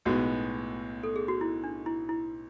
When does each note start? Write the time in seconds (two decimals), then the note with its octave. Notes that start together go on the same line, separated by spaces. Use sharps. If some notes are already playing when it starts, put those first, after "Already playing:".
0.05 B1 A2 G#3 B3 F#4
1.03 A4
1.16 G#4
1.28 F#4
1.41 E4
1.64 D4
1.86 E4
2.09 E4